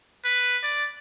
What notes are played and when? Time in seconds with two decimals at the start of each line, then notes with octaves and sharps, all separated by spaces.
0.25 B4
0.63 D5